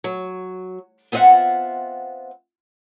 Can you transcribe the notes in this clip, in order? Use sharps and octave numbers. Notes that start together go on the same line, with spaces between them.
F#3
B3 C4 F4 D#5 E5 F#5